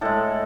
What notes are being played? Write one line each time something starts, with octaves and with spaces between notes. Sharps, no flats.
A2 G#3 A4